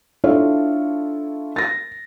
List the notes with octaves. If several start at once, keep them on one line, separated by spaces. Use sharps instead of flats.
D4 E4 F4 A4 C#5 F5
A6 A#6